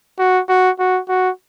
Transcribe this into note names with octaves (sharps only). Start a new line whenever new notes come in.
F#4
F#4
F#4
F#4